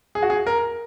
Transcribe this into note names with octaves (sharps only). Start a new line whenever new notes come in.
G#4
F#4
G#4
A#4